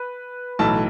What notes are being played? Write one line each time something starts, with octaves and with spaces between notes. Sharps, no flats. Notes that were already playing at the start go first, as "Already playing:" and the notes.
Already playing: B4
B1 A2 E3 A5